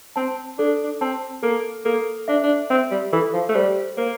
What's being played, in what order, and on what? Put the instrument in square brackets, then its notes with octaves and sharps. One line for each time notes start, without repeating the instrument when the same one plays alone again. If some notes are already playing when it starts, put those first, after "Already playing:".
[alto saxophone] C4 [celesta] A5
[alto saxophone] D4 [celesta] A4
[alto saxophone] D4
[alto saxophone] C4 [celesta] A5
[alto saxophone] A#3 [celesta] A4
[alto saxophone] A#3 [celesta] A4
[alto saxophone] D4 [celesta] E5
[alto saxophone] D4
[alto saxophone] C4 [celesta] E5
[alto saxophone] G3
[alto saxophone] E3 [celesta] A4
[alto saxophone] F3
A3
[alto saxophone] G3 [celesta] C5
[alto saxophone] A#3 [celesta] C5